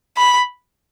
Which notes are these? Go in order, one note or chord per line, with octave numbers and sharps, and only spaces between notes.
B5